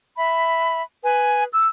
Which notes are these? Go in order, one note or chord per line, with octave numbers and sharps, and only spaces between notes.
E5 B5
B4 G#5
E6